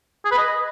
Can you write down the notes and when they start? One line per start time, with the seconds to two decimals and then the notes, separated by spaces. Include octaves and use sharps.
0.25 G#4
0.31 B4
0.38 D#5